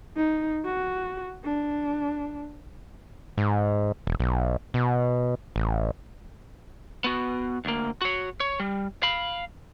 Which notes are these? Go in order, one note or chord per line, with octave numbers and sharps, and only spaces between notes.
D#4
F#4
D4
G#2
E1
B1
B2
A1
B3 F#4
D2 A#3
F#4 C#5
C#5
G3
F5 B5